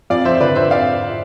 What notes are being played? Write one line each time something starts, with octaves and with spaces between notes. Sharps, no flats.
F2 D5 F5
F3 C5 E5
C5
D3 B4 D5
F2 C5 E5
D5 F5